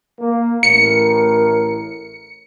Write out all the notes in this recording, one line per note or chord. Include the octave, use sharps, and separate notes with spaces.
A#3
A1 A2 A#4 C#7